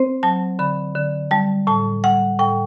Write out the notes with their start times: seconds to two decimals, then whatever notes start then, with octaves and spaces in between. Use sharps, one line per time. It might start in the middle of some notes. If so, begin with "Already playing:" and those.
Already playing: C4 C5
0.23 F#3 A5
0.59 D3 B5
0.95 D3
1.31 G3 A5
1.67 A2 A5
2.04 G3 F#5
2.39 A2 G5